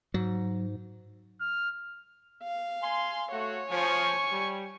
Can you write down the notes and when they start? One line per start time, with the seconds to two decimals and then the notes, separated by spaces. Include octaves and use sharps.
0.14 G#2 F#3
1.41 F6
2.43 F5
2.82 G#5 C6
3.32 A3 F#4 C#5
3.71 F3 G#5 C#6
4.31 G3